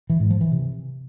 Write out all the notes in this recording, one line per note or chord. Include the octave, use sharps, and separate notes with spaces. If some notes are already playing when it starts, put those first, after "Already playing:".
E3
G#2
F3
E3
C3